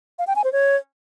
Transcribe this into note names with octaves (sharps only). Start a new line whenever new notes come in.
F5
G5
G#5
C5
C#5